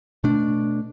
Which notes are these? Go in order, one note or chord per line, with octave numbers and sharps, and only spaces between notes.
B2 A3 D4